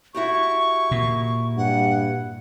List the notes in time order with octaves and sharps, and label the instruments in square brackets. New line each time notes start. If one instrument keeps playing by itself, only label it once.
[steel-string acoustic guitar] E4 F#4 G4 [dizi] C#6
[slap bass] A#2
[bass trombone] G2 [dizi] F#5